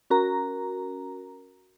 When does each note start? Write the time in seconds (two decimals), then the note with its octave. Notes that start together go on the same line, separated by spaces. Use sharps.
0.10 C#4 F#4 A#4 A#5